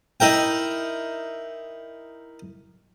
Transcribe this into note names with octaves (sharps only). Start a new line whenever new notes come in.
D#4 E4 A#4 G5